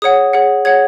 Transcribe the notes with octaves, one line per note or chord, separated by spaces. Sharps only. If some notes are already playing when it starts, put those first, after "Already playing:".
G#4 C#5 F#5 D#6
G#4 C#5 F#5
G#4 C#5 F#5 G#6